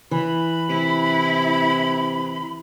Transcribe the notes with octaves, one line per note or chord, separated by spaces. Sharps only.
E3 B5
C3 E4